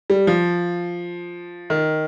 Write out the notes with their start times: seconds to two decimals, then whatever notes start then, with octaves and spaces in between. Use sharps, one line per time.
0.10 G3
0.27 F3
1.70 D#3